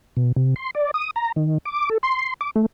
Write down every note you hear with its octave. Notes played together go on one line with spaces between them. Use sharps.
B2
C3
C6
D5
D#6
A#5
D#3
D6
A4
C6
D6
A3